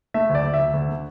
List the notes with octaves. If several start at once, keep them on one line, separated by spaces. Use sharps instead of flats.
A3 E5
D2
D5
D2
E5
D2
D2
D3